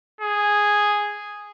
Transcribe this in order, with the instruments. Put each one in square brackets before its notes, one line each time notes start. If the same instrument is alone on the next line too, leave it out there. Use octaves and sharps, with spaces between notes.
[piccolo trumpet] G#4